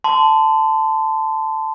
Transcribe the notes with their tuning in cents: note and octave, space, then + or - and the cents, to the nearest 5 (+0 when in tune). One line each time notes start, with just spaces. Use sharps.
A5 +0 C6 -30